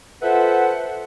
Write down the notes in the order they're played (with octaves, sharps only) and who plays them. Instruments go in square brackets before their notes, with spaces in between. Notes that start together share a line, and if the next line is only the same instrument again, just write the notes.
[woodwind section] F4 A4 B4 C5 E5 F#5